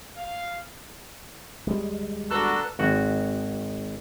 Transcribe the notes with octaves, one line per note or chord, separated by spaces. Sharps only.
F5
D#2 G3 G#3
B3 D4 F#4 A4 B4 A#5 F#6
G#1 F#4